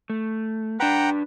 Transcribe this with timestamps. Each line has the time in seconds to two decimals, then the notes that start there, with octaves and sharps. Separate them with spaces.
0.10 A3
0.80 D4 B4 F#5 G5 A#5